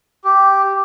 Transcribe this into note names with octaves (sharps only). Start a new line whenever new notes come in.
G4